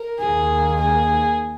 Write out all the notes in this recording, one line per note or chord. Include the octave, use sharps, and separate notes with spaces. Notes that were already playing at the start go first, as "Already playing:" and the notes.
Already playing: A#4
D#2 D#3 A#3 G#4
G#4